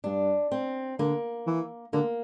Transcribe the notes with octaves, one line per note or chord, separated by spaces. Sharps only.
G2 D4
C4
D3 A#3
E3
D3 A#3